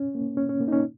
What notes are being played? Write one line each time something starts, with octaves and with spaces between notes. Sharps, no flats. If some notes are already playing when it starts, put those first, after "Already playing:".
Already playing: C#4
A#3
C#4
C#4
A#3
D#4
C#4